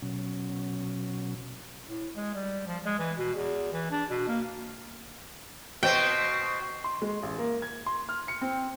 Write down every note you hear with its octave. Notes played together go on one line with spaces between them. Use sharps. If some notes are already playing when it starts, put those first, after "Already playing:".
B2 F#3 C#4
A2
G#3
G3
F3
G#3
E3
B2
E2
E3
D4
B2
A#3
B2 C4 G5
C6
G#3
A1
A#3
G#6
C6
F6
C#7
C4